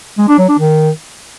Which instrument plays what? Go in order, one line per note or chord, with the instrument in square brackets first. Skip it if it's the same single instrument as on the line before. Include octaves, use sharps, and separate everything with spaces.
[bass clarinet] G#3
D4
F#3
D4
D#3